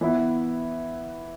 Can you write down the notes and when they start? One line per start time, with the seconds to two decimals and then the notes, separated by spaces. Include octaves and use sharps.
0.01 E3 B3 E4